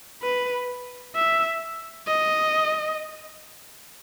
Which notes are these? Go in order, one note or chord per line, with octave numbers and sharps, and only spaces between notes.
B4
E5
D#5